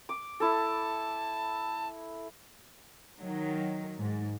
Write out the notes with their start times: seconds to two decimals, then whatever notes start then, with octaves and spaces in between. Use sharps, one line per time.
0.09 D6
0.40 E4 A4 A5
3.19 D#3 F#3
3.99 G#2